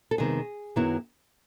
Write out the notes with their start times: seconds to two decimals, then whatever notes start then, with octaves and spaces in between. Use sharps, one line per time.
0.11 A4
0.18 F2 C3 D#3 G#3 B3 G#4
0.76 F#2 D#3 F#3 B3 E4